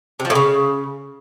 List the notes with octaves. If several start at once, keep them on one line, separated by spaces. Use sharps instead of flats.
C3
F3
A2
C#3